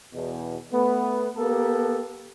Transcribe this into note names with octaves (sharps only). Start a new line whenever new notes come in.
E2 B2
A3 B3
A#3 B3 G4 A4 A#4